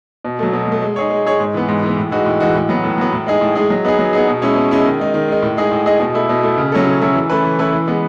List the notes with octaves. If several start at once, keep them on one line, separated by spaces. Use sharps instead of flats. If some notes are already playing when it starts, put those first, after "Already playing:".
B2
F#3 A3
B2
F#3 A3
G#3
D#4 G#4 C#5
G#3
D#4 G#4 C#5
G#2
E3 B3
G#2
E3 B3
A2
E3 G#3 D#4 F#4
A2
E3 G#3 D#4 F#4
A2
F#3 B3
A2
F#3 B3
A2
G#3 D#4 G#4
A2
G#3 D#4 G#4
F#3
B3 D#4 G#4
F#3
B3 D#4 G#4
B2
G#3 C#4 E4
B2
G#3 C#4 E4
D#3
G#3 D#4
D#3
G#3 D#4
A2
G#3 D#4 G#4 D#5
A2
G#3 D#4 G#4 D#5
B2
A3 E4
B2
A3 E4
C#3
F#3 C#4 E4 A4
C#3
F#3 C#4 E4 A4
E3
A3 C#4 E4 B4
E3
A3 C#4 E4 B4
E3
G#3 B3